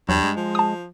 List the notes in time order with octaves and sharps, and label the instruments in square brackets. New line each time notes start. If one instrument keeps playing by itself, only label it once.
[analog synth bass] E2 [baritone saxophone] G2 [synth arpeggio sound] F#3
[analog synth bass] G#3
[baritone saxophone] F3
[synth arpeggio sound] A5 D#6